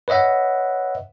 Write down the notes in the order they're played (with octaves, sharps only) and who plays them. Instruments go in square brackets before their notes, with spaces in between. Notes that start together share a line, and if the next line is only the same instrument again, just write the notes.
[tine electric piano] B4 C#5 D#5 E5 F#5